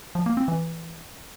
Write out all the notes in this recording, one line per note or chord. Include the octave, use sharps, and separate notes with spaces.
F3
A#3
C4
E3